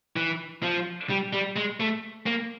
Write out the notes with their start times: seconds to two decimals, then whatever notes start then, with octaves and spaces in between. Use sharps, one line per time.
0.16 E3
0.63 F3
1.10 G3
1.33 G3
1.56 G#3
1.80 A3
2.26 A#3